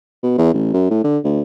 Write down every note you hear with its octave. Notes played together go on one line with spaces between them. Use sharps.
B2
E2
A1
F#2
A2
D3
D2